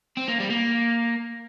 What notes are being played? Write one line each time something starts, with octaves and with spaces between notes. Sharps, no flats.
C4
A#3
G3
A#3